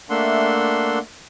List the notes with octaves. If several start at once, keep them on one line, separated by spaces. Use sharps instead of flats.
A3 A#3 D4 E5 F#5 C6